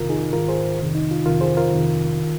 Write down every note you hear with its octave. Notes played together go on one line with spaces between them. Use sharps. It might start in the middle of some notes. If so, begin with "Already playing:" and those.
Already playing: F2 C3 D#3 F4 A#4
D#4 G#4
G#2 D#3 F4 A#4
G#4 C5
F2 C3 D#3
D#4
F4
F2 C3 D#3 F4 A#4
G#4 C5
F4 A#4
F2 C3 D#3
D#3